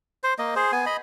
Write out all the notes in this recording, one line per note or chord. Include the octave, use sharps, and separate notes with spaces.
C5
A#3 D#5
G#4 C5
B3 G#5
D#5 B5